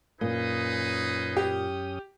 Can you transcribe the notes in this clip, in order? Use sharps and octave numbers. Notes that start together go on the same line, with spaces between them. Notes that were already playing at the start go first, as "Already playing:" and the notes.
F#2 A#2 C#4 D#4 G#4 B4 D#6
G4